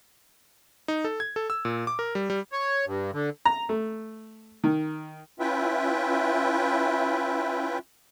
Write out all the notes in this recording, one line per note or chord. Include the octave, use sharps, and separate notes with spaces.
D#4
A4
G#6
A4
E6
A#2
D6
A#4
G3
G3
C#5
G2
D3
A#5
A3
D#3
C#4 E4 F4 B4 E5 G5